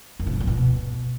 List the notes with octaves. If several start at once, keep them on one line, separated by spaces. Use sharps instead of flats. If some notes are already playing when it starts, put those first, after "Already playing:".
F#2
B2
G#2
A#2
B2